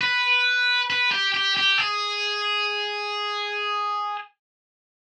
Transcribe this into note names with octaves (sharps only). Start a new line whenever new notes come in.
B4
B4
G4
G4
G4
G#4